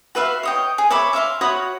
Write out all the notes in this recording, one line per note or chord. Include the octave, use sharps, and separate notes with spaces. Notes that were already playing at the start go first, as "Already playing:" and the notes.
F#4 B4 E5 F5
C#5 D#5 G5
G#4
C#5 E5 B5 D6
E5 F5 B5 C6
F#4 C#5 B5 D#6